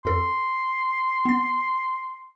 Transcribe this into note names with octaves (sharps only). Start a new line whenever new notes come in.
F2 A4 C6
B3 A6